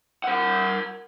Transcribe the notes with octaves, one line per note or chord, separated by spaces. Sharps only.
A#4 F#5